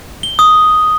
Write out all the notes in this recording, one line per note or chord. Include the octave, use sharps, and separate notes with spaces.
G7
D#6